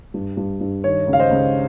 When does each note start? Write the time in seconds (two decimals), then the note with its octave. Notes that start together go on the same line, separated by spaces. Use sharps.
0.14 G2
0.37 G2
0.60 G2
0.84 D#3 C#5
1.07 C#2
1.13 F5
1.19 C5 D#5
1.31 C#2